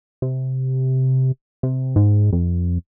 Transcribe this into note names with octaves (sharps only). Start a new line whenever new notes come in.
C3
C3
G#2
F2